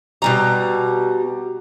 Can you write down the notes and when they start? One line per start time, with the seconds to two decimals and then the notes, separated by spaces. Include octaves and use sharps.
0.22 B2 G3 A#5